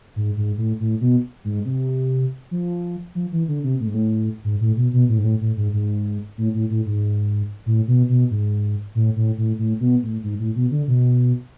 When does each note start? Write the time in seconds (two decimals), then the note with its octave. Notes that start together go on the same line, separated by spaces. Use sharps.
0.16 G#2
0.37 G#2
0.58 A2
0.80 A2
1.01 B2
1.44 G#2
1.65 C3
2.51 F3
3.15 F3
3.32 E3
3.48 D3
3.64 C3
3.80 A2
3.87 G#2
3.94 A2
4.44 G#2
4.61 A2
4.77 B2
4.93 B2
5.09 A2
5.18 G#2
5.24 A2
5.41 A2
5.57 G#2
5.73 G#2
6.37 A2
6.54 A2
6.70 A2
6.86 G#2
7.66 A2
7.88 B2
8.09 B2
8.31 G#2
8.95 A2
9.16 A2
9.38 A2
9.58 A2
9.80 B2
10.03 A2
10.23 G#2
10.40 A2
10.55 B2
10.71 D3
10.87 B2